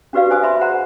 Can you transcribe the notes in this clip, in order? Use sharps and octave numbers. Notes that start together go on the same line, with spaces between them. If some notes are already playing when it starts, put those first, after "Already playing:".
D4 F#4 G4 B4 D5 F5
D4 C5 D5 G#5 A5 D#6
E5 A5 B5 C6
G#4 C5 F#5 A#5 C6